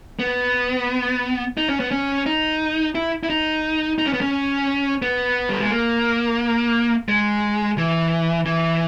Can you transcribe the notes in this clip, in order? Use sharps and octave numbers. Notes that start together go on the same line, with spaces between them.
B3
D#4
C#4
B3
C#4
D#4
E4
E4
D#4
D#4
C#4
B3
C#4
B3
G3
G#3
A#3
G#3
E3
E3